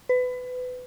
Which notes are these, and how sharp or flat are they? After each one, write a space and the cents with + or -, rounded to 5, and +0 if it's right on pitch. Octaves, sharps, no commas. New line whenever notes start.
B4 +25